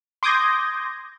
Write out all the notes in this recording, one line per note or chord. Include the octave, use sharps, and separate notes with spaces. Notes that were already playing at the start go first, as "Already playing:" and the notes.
C6 D6 D#6 G6 G#6 A#6